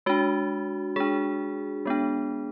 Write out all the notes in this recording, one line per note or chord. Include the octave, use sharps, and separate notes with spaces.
G#3 D4 F#4
G#3 D4 G#4
G#3 B3 D4